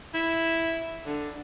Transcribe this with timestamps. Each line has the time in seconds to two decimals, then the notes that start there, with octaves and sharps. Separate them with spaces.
0.14 E4
1.06 D3